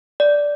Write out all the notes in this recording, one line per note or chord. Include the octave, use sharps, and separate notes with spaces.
D5